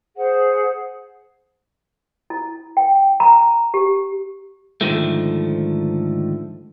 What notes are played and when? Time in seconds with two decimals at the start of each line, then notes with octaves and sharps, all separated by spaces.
0.16 G#4 C5 F#5
2.30 E4
2.77 G5
3.20 A#5
3.74 G4
4.81 G#2 D3 D#3 F3 A3